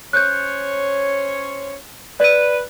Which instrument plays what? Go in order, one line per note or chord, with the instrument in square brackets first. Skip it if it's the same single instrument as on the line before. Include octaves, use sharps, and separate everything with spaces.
[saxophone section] C#4 C5 C#5 [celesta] F#6 G6
[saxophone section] B4 [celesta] D5 D#7